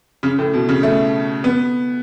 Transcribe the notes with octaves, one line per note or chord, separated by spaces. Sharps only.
C#3
A2
B2
C#3
A3
B3